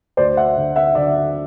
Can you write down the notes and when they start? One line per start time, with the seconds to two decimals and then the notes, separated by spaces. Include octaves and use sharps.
0.17 D2 C5 D5
0.37 E5 F#5
0.57 D3
0.76 E5 F#5
0.95 D3 D5 E5